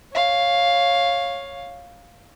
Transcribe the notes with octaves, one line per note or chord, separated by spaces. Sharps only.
C#5 F5